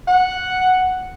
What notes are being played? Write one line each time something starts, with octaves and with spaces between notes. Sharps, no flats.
F#5